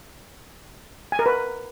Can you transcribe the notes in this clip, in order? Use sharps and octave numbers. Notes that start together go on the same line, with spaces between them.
G#5
A#4
B4